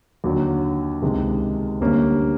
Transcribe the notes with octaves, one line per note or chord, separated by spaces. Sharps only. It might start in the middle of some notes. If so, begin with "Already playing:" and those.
D#2 D3 F#3
C#2 C3 D#3 G#3
D2 D3 G3 A#3 C#4